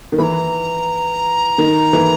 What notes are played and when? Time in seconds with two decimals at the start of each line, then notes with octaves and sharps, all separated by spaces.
0.12 D#3
0.18 E3 A#5 B5
1.58 D#3
1.93 E3